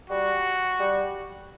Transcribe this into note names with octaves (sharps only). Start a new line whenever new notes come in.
G3 F#4
G3